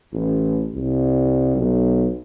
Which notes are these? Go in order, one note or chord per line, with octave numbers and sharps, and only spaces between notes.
A1
C2
B1